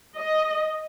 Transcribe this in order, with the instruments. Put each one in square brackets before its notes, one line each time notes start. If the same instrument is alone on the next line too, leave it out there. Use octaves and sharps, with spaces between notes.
[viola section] D#5